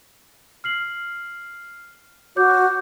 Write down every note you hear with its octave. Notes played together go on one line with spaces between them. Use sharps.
F6 C7 F#7
F#4 C#5 D6 G6